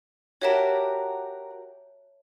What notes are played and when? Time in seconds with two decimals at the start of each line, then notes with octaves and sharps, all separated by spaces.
0.41 F#4 G4 A#4 C#5 E5 A5